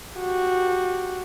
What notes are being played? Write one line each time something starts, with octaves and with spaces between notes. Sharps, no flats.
F#4 G4